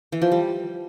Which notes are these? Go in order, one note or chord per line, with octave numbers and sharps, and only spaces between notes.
E3
F3
G3